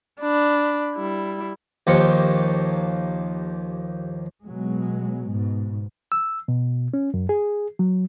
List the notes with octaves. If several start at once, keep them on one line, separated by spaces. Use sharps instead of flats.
D4 B5
G3 E4
D#2 F3 A#3 G4 C#6
B2 F#3 G#3
G#2 B2
E6
B2
C#4
F#2
G#4
F#3